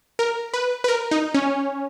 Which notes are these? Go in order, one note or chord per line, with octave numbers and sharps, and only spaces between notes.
A#4
B4
B4
A#4
D#4
C#4